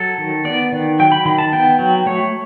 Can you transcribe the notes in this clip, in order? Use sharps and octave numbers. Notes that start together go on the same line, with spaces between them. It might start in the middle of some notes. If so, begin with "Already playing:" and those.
Already playing: F#3 A4
D#3
B3 D5
D#3
F#3 G5
B5
D#3 B5
A5
B3 G5
F#3
A3 C#5